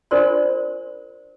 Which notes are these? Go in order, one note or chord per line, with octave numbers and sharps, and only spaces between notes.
D4 F4 A#4 C5 D5 C6